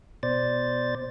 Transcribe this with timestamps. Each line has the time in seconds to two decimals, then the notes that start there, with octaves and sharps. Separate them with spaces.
0.23 B2 C5 D5 A6